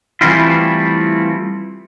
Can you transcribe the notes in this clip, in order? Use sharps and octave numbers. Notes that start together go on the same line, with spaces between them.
E3 G3 A3 C4 E4 F4